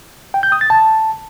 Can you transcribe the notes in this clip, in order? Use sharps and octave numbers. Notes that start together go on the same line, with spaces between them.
G5
G6
D#6
A6
A5